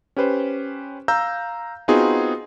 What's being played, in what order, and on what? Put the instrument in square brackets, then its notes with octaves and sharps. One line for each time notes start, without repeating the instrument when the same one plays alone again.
[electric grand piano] C#4 G4 B4 C5
F5 A#5 E6 G6 A#6
B3 C4 D#4 F4 F#4 G#4